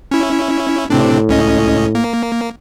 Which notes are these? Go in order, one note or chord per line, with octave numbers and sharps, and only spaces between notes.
C#4 E4
A2 C3 C4 D4
C#2 C#4 D#5
A#3